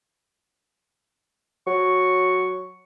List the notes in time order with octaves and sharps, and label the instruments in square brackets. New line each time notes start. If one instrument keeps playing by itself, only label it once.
[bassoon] F#3 [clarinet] C#6